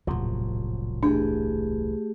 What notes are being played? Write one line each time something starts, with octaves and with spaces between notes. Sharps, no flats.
D#1 C2 A2 F3 F#3
C2 E3 A3 D4 G4 G#4